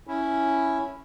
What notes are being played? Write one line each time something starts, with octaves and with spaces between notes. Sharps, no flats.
C#4 E4